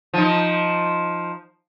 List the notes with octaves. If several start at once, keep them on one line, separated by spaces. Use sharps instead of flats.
F3 D#4